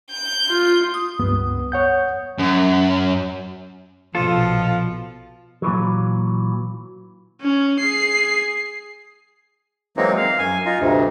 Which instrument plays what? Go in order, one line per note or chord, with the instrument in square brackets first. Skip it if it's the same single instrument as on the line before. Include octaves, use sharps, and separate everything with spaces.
[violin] G6
[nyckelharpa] F4
[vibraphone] D#6
[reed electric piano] C#2 G2 B3
C#5 F#5 G6
[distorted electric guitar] F#2
[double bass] A#1 B2 [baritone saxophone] F3 [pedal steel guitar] F4 A4
[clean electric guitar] A#2 E3 F#3
[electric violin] C#4
G#4 C7
[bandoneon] E3 F#3 G#3 A#3 C4 D#4
F5
F#2 G#5
D#4 F4
D2 G2 C3